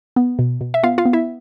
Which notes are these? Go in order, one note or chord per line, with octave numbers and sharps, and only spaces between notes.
B3
B2
B2
E5
B3 F4 F5
F4 F5
B3
E4 E5